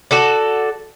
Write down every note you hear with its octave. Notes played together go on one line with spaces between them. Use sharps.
F#4 A4 D5